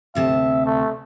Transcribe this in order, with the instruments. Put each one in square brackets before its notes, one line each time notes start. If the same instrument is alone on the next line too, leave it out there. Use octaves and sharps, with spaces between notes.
[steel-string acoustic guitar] D2 C3 A5 [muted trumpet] E5
[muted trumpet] A3